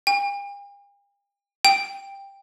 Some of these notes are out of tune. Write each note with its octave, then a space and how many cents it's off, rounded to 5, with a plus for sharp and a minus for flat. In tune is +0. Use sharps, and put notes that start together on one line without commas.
G5 +45
G5 +10